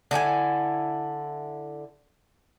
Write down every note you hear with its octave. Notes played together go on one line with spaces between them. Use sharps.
D3 E4 G4 G#5